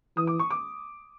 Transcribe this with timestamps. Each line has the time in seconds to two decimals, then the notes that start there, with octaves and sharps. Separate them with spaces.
0.17 E3 D#6
0.27 D6
0.39 C#6
0.51 D6